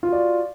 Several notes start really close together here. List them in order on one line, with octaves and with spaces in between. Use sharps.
F4 F#4 D5